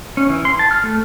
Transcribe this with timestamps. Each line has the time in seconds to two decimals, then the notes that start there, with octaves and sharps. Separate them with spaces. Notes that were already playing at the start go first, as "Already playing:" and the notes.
0.17 C#4
0.29 E3
0.45 C6
0.59 A5
0.71 F6
0.83 A3